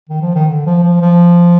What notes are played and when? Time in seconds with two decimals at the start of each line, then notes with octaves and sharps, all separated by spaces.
0.09 D#3
0.21 F3
0.35 D#3
0.48 D3
0.66 F3
0.83 F3
1.01 F3